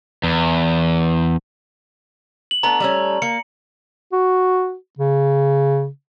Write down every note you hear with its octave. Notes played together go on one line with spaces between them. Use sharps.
E2
F#7
A3 B3 D4 A#5
G3 A3 C#4
A#3 C#7
F#4
C#3